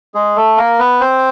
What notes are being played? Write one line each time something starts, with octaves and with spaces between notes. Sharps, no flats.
G#3 G#4
A3 A4
A#3 A#4
B3 B4
C4 C5